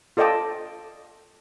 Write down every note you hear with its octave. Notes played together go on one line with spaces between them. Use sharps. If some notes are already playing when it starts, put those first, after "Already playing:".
F4 A4 D5 D#5 G5 A5